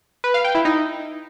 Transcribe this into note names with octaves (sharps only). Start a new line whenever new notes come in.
B4
F5
G5
E4
D#4